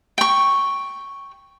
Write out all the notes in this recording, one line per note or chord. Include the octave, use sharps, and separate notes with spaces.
G5 C#6